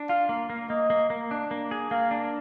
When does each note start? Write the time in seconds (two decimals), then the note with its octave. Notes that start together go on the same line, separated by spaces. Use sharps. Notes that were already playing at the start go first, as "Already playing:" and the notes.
Already playing: D4
0.09 F4 F5
0.29 A#3
0.50 A#3
0.70 A#3 D#5
0.90 A#3
1.10 A#3
1.31 D4
1.51 A#3
1.71 G#4
1.91 A#3 F5
2.11 D4